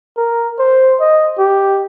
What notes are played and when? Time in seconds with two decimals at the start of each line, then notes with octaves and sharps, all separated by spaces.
0.17 A#4
0.59 C5
1.00 D#5
1.39 G4